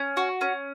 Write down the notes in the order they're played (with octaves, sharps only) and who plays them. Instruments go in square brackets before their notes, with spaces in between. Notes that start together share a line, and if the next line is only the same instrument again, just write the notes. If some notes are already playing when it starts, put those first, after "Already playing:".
Already playing: [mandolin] C#4
F#4
C#4